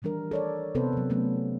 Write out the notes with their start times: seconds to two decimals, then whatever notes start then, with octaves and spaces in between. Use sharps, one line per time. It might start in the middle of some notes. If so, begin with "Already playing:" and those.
0.02 D#3 E3 G3 D4 A#4
0.31 A4 C#5 D5
0.75 C3 B3 C4 A4 B4 C5
0.93 C3 F#3
1.10 F#3 A3 B3 C#4